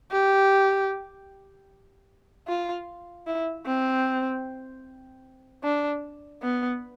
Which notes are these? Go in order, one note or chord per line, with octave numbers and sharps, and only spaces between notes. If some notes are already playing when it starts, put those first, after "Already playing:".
G4
F4
E4
C4
D4
B3